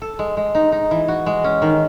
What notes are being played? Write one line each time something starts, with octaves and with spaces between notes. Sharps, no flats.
A4
G#3
G#3
D#4
D#4
E3
F#4
G#3
C#4
D#3